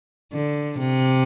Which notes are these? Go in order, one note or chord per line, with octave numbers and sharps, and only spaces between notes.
D3
C3